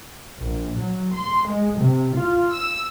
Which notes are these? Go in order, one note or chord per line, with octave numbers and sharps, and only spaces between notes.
A#1
F#3
C6
G#3
C3
F4
E6